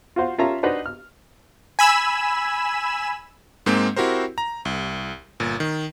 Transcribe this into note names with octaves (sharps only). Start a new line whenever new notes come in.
F4 F#4 C5 F5
C#4 F4 A#4 E5 A5 A#5
D4 D#4 F#4 B4 C5 D#5
F6
G#5 B5 E6 E7
G#2 G#3 A#3 C4 G6
C4 E4 F#4 G4 A#4 C5
A#5
C2
G1 A#2
D#3